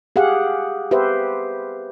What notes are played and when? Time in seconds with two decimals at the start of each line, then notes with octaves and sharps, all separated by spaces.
0.16 G4 G#4 F5 F#5
0.91 G4 B4 C5 E5